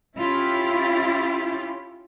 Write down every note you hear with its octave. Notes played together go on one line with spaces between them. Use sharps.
C#4 E4 F4 G4